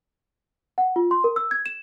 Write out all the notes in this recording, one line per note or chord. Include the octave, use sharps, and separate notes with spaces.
F#5
F4
C6
A#4
E6
G#6
E7